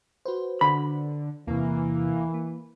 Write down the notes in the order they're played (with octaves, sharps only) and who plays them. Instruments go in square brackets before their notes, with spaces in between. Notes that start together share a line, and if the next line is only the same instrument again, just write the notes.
[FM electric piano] F#4 B4 C5
[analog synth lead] D3 [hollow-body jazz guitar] B5
[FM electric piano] E2 C3 [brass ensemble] E3 [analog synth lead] A#3
[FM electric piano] A#3